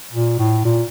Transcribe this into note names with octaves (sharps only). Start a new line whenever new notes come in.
A#2
A2
A#2